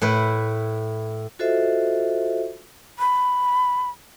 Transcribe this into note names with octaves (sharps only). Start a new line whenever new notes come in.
A2 E4 B4
F4 F#4 A4 C5 D#5 E5
B5